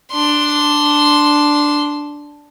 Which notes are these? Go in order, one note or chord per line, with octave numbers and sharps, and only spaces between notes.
D4 C6